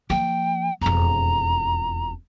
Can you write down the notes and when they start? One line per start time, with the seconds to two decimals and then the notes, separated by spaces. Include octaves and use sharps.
0.10 F3 A#3 G5
0.81 E1 F2 A#5